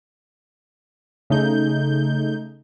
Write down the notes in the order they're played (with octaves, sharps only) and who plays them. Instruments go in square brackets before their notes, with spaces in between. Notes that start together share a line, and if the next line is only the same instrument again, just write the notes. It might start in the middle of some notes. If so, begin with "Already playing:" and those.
[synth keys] C#3 A3 D#4 G6